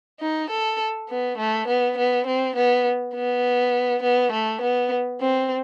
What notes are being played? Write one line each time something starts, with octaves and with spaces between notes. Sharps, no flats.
D#4
A4
B3
A3
B3
B3
C4
B3
B3
B3
A3
B3
C4